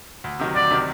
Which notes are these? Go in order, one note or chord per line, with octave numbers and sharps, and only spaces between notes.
D2
C3 D#3 F#3
D2 D5
C3 D#3 F#3